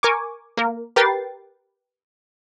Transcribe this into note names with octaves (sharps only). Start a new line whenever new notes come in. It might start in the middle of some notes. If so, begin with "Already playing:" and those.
A#4 G#5 C#6 D6
A#3 A#4
G4 A#4 B4 G5 A6 C7